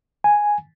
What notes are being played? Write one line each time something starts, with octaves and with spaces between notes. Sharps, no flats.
G#5